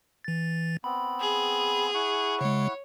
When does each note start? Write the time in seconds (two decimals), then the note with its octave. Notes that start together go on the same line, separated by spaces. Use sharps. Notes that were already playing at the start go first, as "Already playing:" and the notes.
0.24 E3 A6
0.84 B3 C4 B5
1.20 G#4
1.94 E4 F#5 C#6
2.41 C#3 G#3 C#5